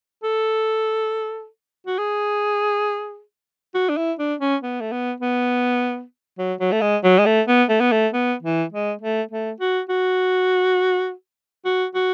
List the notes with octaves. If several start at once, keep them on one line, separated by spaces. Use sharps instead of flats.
A4
F#4
G#4
F#4
D4
E4
D4
C#4
B3
A3
B3
B3
F#3
F#3
A3
G#3
F#3
G#3
A3
B3
A3
B3
A3
B3
E3
G#3
A3
A3
F#4
F#4
F#4
F#4